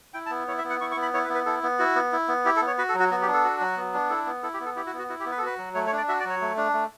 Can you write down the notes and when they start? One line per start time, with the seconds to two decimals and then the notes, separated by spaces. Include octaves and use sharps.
0.14 E4 G5
0.26 A5
0.30 B3
0.47 E4 C#5
0.58 E5
0.64 B3
0.70 F#5
0.81 E4 C#6
0.91 C#6
0.96 B3
1.02 B5
1.13 E4 C#5
1.24 B4
1.29 B3
1.35 B4
1.46 E4 A4
1.63 B3
1.79 E4 F#4
1.95 B3
2.13 E4
2.28 B3
2.45 E4 G4
2.56 A4
2.62 B3
2.67 C#5
2.78 F#4 B4
2.89 A4
2.94 F#3
3.00 F#4
3.11 B3 F#4
3.22 G4
3.27 D4
3.33 A4
3.44 F#4
3.60 F#3
3.77 B3
3.94 D4
4.10 E4 A4
4.26 B3
4.43 E4 A4
4.54 G4
4.60 B3
4.65 A4
4.76 E4 G4
4.87 F#4
4.93 B3
4.99 F#4
5.09 E4 F#4
5.20 G4
5.25 B3
5.31 B4
5.38 A4
5.42 F#4 B4
5.58 F#3
5.75 A3 C#5
5.86 C#5
5.92 D4
5.98 D5
6.08 F#4 E5
6.20 D5
6.25 F#3 C#5
6.41 A3
6.57 D4
6.74 A3